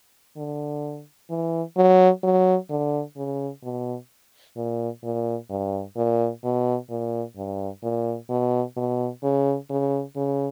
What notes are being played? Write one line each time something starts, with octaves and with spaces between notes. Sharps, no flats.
D3
E3
F#3
F#3
D3
C#3
B2
A#2
A#2
G2
A#2
B2
A#2
G2
A#2
B2
B2
C#3
C#3
C#3